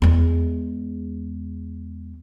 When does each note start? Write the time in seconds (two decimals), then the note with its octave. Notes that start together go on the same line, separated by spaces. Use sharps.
0.02 E2 G#3